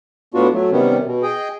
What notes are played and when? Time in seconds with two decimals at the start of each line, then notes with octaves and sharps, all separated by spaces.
0.34 A2 B3 D4 F4 F#4
0.53 F#3 A3
0.72 C3 D#3 G3 B3 C#4
1.05 B2
1.23 G#4 D#5 G5